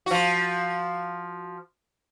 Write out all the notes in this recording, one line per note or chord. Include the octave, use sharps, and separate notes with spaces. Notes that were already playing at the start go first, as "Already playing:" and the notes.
F3 F#4